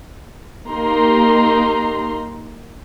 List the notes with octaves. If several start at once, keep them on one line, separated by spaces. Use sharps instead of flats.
A#3 D#4 G4 A#5 C6